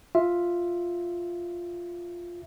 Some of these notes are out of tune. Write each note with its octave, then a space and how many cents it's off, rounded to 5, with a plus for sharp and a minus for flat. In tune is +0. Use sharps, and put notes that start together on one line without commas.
F4 +0 E5 +0